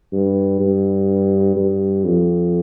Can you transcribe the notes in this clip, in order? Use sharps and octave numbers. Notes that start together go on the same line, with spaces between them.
G2
G2
G2
F2